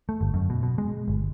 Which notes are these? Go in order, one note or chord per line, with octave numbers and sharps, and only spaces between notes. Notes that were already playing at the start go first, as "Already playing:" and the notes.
A3
G1
F#2
B2
B2
G#3
G1